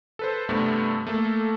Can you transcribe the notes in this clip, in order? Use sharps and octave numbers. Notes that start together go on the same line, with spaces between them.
A4 B4 C5
G2 C3 G3 A3 B3 C4
A3 A#3 A4